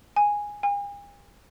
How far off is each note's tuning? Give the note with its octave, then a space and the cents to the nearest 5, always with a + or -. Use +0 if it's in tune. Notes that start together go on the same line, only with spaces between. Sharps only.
G#5 -10
G#5 -45